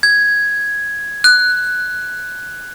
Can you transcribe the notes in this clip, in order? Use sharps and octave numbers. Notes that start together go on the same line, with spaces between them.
G#6
F#6